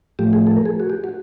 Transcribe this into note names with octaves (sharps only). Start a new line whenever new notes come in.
A2 F3 A3 G4
G#4
A4
A#4
G#4
F#4
G4
F#4